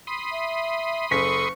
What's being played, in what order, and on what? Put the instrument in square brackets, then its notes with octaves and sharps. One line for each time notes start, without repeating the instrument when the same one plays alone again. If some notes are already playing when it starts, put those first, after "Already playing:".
[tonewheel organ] B5 C6 D#6
[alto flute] E5
[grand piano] F#1 B6 [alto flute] A4 [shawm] C#6